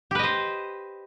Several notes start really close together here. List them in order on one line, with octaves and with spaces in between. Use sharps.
G4 B4 D#5 C5